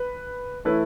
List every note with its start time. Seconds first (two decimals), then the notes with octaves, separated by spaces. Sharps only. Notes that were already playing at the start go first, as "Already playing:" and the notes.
Already playing: B4
0.65 E3 A3 E4 B4 C#5